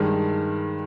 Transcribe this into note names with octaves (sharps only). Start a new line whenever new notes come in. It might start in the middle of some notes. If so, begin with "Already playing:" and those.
Already playing: G2 D#3 G#3